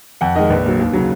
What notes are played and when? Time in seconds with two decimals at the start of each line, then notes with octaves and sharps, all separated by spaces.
0.21 F2 F#5
0.36 D#3 G#3 D#5
0.50 A#1 B4
0.65 A#2 F#3
0.79 D#2
0.93 C#3 F#3